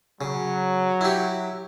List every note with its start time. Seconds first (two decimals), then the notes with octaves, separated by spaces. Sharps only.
0.21 C#3 F#3
1.01 E4 G4